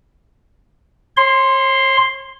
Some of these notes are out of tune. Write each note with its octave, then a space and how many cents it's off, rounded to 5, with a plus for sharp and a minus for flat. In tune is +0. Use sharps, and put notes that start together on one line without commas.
C#5 -40 C6 +0